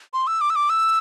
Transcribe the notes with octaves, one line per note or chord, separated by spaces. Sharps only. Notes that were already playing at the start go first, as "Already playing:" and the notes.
C6
E6
D6
E6
D6
E6